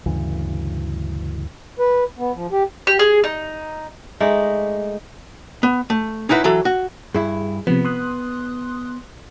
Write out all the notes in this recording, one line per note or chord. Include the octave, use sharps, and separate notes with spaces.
D2 G2 C#3 E3
B4
B3
F3
G4
G4
G#4
D#4
G#3 A3 D#4 D5
B3
A3
C#4 D#4 E4 F#4 B4
E3 F#3 A4
F#4
G2 E4 G#4
C3 F3 B3
C6 D#6 F#6